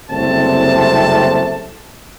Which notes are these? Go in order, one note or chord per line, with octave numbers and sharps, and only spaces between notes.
F#1 C2 C3 A3 C4 A5